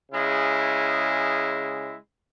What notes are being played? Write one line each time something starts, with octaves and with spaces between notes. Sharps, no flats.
C#3 G#3 E4